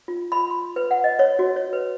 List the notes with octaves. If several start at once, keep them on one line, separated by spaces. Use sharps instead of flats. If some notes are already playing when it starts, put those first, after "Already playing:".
F4
B5
C6
B4
F#5
D#5
C#5
F#4
C#5
B4